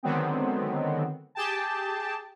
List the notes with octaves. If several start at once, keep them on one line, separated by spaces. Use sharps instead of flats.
D3 D#3 F#3 G#3 B3 C4
G4 G#4 G5 A5